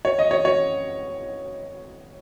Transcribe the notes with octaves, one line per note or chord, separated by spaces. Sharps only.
C#5
D#5
C#5
C#5